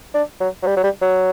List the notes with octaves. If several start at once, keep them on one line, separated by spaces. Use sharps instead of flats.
D4
F#3
F#3
G3
F#3
G3
F#3